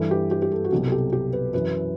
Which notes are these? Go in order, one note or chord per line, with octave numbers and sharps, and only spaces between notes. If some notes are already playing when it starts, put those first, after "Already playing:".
Already playing: G2 E3 A4
G4
G4
G4
A4
F#4
C2 B2 F#3 G4
A4
G4
G4
B4
F#2 E3 B4